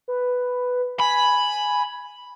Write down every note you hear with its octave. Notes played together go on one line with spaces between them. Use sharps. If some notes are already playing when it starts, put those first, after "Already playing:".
B4
G#5 B5